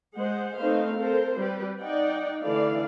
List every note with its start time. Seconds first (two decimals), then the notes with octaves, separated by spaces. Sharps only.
0.16 G#3 G#4 C5 F#5
0.57 A3 C4 D#4 B4 C5 F5
0.96 C4 A4 A#4 C5
1.35 G3 C4 G4 B4
1.80 D#4 D5 F#5 G5
2.41 D3 E3 A3 D5 F5